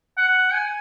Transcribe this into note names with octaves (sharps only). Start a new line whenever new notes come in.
F#5
G#5